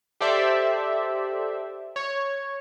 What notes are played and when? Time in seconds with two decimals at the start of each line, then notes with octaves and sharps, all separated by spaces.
0.21 G4 A4 C5 D5 E5
1.96 C#5